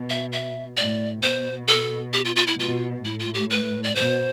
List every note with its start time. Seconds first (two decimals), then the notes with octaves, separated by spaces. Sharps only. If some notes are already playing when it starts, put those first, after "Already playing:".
Already playing: B2
0.10 E5
0.32 E5
0.77 A2 D5
1.23 B2 C5
1.68 A4
2.13 G4
2.25 F4
2.36 F4
2.47 E4
2.59 B2 F4
3.05 A2 E4
3.20 F4
3.34 G4
3.50 B4
3.84 D5
3.95 B2 C5